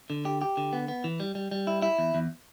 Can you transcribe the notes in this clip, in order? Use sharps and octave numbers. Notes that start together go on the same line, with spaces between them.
D3
G4
G4
D3
B3
B3
E3
G3
G3
G3
E4
E4
E2
E2